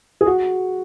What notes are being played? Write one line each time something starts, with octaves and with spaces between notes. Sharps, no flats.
G#4
F#4